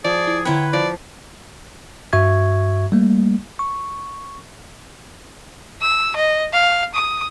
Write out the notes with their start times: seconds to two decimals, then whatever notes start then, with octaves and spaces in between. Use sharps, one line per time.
0.04 F3 G#4 D5
0.27 E4
0.45 D3 E4 B4 C#5 G5 A#5 F#6
0.73 F3 D5 F5
2.13 G2 F#4 E5 C#6 G#6
2.92 G3 A3 A#3
3.59 C#6
5.82 E6
6.16 D#5
6.54 F5
6.95 D#6